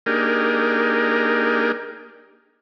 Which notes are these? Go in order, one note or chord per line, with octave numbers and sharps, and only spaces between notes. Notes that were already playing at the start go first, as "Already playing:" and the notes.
A#3 D4 D#4 G4 G#4 A#4